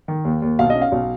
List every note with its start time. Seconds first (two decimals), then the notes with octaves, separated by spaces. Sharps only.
0.08 D#3
0.25 D#2
0.42 D#2
0.59 B1 F5
0.70 D#5
0.75 C#4
0.82 F5
0.92 B1